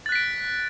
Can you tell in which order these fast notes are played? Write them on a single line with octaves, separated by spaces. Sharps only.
A6 F#6 B6 D7